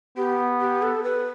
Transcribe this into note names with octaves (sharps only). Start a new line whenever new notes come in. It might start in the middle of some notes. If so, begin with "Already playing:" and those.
B3 G4
G4
A4
B4